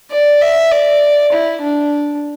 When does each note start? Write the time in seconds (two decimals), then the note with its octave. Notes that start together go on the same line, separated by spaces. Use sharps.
0.11 D5
0.41 E5
0.72 D5
1.32 E4
1.62 D4